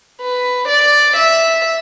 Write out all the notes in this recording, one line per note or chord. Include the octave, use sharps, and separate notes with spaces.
B4
D5
E5